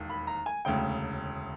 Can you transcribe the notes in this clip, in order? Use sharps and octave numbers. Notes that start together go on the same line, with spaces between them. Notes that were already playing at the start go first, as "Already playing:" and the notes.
Already playing: E1 D#2
B5
A#5
G#5
E1 D2 C#3 G5